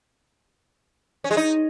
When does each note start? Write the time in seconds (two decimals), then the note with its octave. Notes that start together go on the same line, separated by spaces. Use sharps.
1.24 C#4
1.31 G#3
1.37 D#4